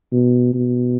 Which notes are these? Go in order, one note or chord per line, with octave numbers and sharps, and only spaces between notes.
B2
B2